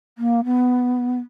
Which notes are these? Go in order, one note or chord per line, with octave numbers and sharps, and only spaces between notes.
A#3
B3